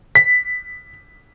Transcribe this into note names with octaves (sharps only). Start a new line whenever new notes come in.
B6